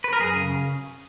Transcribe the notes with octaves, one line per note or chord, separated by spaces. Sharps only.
B4
A#4
F#2 G#4
C#3